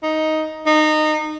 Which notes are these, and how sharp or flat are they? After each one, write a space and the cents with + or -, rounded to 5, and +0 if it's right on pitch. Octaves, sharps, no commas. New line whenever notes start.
D#4 +10
D#4 -20